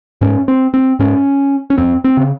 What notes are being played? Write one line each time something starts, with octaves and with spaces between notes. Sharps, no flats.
G#2 C#4
C4
C4
G#2 C#4
C#4
F2 C4
C4
C#3